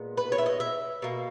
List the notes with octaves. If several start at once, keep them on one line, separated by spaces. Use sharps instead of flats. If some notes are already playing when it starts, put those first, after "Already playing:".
Already playing: A#2 G#3 B3
B4
C#5
E5
D#5
E5
B2 A#3